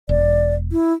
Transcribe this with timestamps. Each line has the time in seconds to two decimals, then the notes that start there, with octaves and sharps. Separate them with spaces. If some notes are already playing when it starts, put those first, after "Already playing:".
0.09 E1 D5
0.72 E4